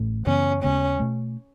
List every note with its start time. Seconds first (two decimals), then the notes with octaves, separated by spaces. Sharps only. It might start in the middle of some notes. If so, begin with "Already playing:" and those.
Already playing: A1 A2 A3
0.27 F#2 C#3 E3 B3 C#4
0.62 D#2 C#3 G#3 B3 C#4
0.99 B2 A3